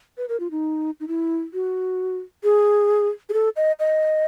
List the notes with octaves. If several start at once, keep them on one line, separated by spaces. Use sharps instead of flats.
B4
A#4
F4
D#4
D#4
E4
F#4
G#4
G#4
A4
D#5
D#5